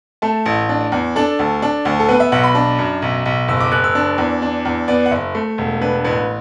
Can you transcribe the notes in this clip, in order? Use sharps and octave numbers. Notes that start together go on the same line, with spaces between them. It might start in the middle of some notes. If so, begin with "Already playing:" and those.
A3 A5
A1
D4
E2
D4 A4
D2
D4
D2
A4
B3 B4
E5
B1 F#5
B5
D4
F#2
B1
B1
F#1 E6
D6
F#1 F#6
E6
D4
E2
D4
E2
B3 D5
F#5
F#1 E5
A3
E1
D4 B4
A1 B4